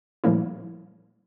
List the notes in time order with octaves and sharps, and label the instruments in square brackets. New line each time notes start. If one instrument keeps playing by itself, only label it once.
[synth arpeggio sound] A#2 F3 G3 A3 A#3 E4